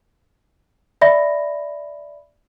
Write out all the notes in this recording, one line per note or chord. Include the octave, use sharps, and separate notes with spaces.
D5 E5 B5 A#6